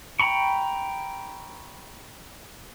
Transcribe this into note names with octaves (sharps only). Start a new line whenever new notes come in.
G5 A#5 B5 C#6